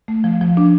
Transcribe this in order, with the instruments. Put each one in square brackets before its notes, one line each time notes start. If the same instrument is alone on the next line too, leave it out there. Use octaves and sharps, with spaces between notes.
[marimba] A3
F3
F3
D4